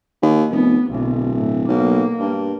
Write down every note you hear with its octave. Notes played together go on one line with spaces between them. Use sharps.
D#2
F1 B3
D1 B1
A2
B1 A#3
G2